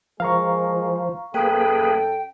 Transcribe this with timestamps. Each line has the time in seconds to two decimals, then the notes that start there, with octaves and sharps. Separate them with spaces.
0.20 F3 G#3 G#4 A#4 F5 A#5 C#6
1.34 F#2 A#3 C#4 G#4 A4 B4 G5